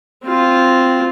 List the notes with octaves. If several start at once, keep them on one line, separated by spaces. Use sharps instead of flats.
C4 F4